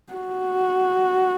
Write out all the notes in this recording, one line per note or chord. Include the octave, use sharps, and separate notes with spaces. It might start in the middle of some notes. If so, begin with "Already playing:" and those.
F#4